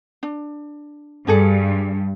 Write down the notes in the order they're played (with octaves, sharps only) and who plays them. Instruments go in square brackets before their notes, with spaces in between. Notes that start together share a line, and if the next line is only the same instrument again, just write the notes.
[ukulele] D4
[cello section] G2 [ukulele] D4 G#4 A4